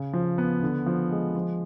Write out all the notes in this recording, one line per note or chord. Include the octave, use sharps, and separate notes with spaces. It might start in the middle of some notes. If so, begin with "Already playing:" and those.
Already playing: C#3
F3
B3
D3
F3
G#3
F3